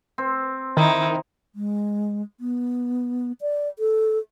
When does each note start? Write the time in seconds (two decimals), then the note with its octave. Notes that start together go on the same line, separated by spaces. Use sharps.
0.18 C4
0.77 D#3 D#4 E4
1.55 G#3
2.40 B3
3.41 D5
3.79 A4